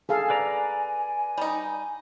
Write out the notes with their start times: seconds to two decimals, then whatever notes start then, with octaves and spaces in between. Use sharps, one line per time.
0.09 G#4 A4 F5 G#5
0.30 B4 D5 A#5
1.37 G3 D#4